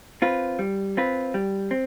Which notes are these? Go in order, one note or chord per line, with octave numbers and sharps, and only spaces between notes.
C4 F4 B4
G3
C4 F4 B4
G3
C4